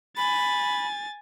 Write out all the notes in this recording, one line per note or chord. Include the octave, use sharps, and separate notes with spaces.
G#5 B5 A6